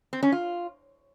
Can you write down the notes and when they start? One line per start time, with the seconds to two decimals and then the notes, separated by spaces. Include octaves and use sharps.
0.13 C4
0.23 C#4
0.32 F4